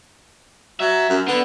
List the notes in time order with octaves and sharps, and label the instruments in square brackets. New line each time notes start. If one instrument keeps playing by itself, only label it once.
[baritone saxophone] F#3 [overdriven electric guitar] E5
[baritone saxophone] F#2
[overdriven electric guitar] D3 [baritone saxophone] B3